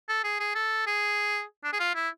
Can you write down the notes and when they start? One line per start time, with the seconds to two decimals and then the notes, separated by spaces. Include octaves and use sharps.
0.08 A4
0.24 G#4
0.40 G#4
0.55 A4
0.87 G#4
1.64 D4
1.73 G#4
1.80 F4
1.95 E4